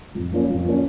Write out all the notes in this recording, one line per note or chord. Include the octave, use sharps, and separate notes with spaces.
F2
F3 A#3 C#4 F4
F2
F3 A#3 C#4 F4